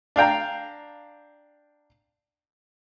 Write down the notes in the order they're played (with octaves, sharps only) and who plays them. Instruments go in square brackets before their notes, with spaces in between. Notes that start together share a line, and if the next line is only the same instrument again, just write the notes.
[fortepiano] D4 F5 G5 A#5